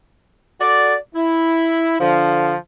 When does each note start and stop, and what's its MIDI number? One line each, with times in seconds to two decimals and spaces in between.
0.60 0.95 66
0.60 0.95 69
0.60 0.95 74
1.15 1.99 64
2.00 2.56 50
2.00 2.56 53